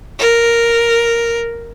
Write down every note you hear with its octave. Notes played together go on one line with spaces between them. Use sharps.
A#4